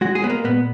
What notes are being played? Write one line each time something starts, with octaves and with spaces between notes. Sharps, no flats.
G#3 F#4
G#4
G#3 B3
A#3
A#2 B3